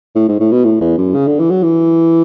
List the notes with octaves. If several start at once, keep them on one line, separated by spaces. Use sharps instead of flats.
A2
G#2
A2
B2
A2
E2
F#2
C#3
D3
E3
F#3
E3